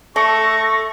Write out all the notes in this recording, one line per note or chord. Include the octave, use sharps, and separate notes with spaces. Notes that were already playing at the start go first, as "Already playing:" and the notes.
A3 A4 C#6 A#6